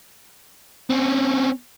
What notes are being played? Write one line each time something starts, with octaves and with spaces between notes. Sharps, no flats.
C4 C#4